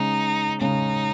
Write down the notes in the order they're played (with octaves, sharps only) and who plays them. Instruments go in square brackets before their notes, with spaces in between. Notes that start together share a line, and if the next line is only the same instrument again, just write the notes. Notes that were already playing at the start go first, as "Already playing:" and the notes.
Already playing: [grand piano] C#3 G#3 C#4 [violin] D#4
[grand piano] C#3 G#3 C#4 [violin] D#4